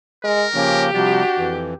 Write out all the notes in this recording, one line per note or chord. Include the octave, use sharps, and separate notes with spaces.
G#3 A#4
C#3 F3 A#3 C#4 G4
C3 F3 G3 D4 F#4
F2 E3